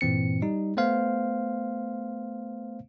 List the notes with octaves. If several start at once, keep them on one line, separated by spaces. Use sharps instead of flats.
G2 A#2 E3 C4 C#7
G3 D#4
A3 B3 C5 F5